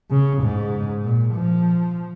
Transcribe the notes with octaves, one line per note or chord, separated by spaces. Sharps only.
C#3
G#2
A#2
F3